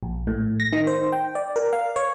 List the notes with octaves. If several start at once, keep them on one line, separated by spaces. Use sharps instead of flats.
A#1
A2
A#6
D#3
C5
G5
D5
A#4
F5
C#5